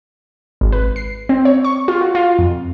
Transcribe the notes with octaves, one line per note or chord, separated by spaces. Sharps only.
G#1
B4
C7
C4
C#5
C#6
F4
F#4
F4
F2